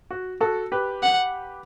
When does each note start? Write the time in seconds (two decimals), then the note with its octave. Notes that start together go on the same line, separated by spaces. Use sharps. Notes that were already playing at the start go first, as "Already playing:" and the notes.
0.11 F#4
0.41 F#4 A4
0.72 G4 B4
1.03 F#5